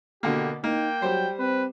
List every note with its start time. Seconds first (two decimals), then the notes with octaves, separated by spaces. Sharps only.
0.23 B2 D3 A#3 G4
0.64 A#3 D#4 G5
1.02 F#3 G3 C5
1.39 C4 B4